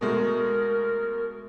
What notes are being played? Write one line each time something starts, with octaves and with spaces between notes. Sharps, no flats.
B2 G#3 A3 A#4